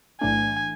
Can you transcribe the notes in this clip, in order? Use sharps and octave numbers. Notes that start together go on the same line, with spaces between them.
B1 A2 E3 A3 D4 G#5